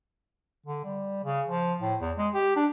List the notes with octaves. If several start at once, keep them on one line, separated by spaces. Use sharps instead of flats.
D3
G3
C#3
F3
A2
E2
G#3
G4
D4